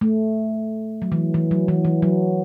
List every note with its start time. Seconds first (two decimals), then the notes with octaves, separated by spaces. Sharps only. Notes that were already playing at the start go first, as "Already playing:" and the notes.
0.01 A3
1.02 F#3
1.12 E3
1.34 E3
1.51 F#3
1.68 E3
1.85 E3
2.02 F#3